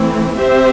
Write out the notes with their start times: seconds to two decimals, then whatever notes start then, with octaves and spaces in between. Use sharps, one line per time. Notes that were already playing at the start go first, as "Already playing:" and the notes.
Already playing: E3 A3 C4 E4
0.36 C4 G4 C5 E5